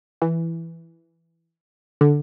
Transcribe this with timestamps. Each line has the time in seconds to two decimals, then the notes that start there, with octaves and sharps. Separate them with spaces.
0.22 E3
2.01 D3